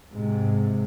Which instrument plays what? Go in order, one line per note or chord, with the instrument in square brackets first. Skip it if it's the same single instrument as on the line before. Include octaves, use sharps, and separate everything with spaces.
[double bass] G#2 C3